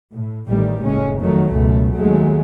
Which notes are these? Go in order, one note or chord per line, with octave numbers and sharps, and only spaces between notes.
A2
A1 A2 D#3 G3
F#1 C#2 A2 G#3 C#4
F2 D#3 F#3 A3
C#2 F#2 B2 A3
D#2 F#3 G#3 A3